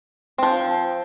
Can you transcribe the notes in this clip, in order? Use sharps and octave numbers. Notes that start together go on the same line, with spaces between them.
F3 C4